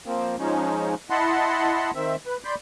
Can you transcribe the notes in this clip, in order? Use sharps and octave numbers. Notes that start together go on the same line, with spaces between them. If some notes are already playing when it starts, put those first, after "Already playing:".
F3 A#3 C4
F3 G#3 C#4 D#4
E4 D#5 F#5 A5 B5 C6
D#3 C4 E5
B4
D5 B5 C6 G6